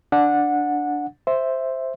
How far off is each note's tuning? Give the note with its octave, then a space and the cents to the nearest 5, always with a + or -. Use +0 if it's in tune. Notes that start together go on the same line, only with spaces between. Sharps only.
D4 +0 F#5 -20
C5 +0 E5 +0